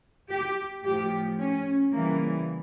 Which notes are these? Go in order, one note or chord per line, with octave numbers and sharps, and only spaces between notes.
G4
A2 F3 G4
C#4
C#3 E3 G3 A#3